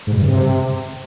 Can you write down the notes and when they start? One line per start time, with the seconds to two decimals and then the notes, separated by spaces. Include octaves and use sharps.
0.07 G#2
0.12 B2
0.17 G2
0.22 C#3
0.27 C3